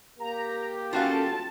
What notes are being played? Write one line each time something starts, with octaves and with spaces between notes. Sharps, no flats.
A#3 G4 A#5
C#4 F4 F#4 A4 F5 G5 A5